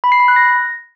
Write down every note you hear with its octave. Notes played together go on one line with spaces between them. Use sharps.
B5
C7
B5
F#6
A#6